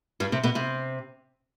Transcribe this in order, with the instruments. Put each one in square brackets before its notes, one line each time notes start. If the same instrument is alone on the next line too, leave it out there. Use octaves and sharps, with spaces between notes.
[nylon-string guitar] G2 G3
C3 C4
B2 B3
C3 C4